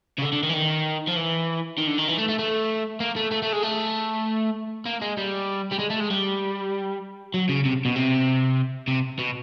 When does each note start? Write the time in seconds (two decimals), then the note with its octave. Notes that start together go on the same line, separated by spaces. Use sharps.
0.18 C#3
0.22 D3
0.32 D3
0.43 D#3
0.49 E3
0.54 D#3
1.08 F3
1.16 E3
1.78 D#3
1.87 D3
1.98 D#3
2.08 E3
2.18 A3
2.29 A3
2.39 A3
3.00 A#3
3.16 A3
3.32 A3
3.43 A3
3.53 G#3
3.63 A3
4.86 A#3
5.02 G#3
5.18 G3
5.71 G3
5.79 G#3
5.90 A3
6.00 G#3
6.10 G3
7.34 F#3
7.49 C#3
7.65 C3
7.85 B2
7.96 C3
8.88 C3
9.19 B2